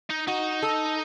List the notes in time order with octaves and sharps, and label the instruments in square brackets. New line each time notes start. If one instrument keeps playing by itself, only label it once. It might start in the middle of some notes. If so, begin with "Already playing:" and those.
[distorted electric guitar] D#4
[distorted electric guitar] D#4 [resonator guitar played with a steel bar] F#4
[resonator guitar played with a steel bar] A4